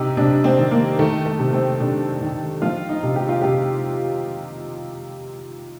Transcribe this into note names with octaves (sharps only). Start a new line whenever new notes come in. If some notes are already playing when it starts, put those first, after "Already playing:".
Already playing: C3 D#4 G4
C3 D4
C4
D#3
A#3
D#3 A3
A3
C3
C4
C3 D4
D#3
F3 F4
D#4
C3
G4
F4
C3 G4